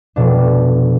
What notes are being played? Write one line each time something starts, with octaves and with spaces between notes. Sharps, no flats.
F1 B2 D4